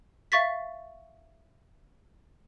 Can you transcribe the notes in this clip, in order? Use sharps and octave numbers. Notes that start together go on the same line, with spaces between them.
E5 F5 C#6 A6 B6